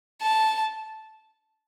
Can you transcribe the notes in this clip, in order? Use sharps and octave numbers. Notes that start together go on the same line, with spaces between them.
A5